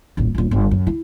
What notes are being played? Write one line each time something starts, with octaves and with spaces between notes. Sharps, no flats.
D#1 A1
D#1 A#1
G1
F#2
E4